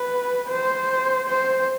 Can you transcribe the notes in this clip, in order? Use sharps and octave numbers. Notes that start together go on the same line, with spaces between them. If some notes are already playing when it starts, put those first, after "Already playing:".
Already playing: B4
C5
C5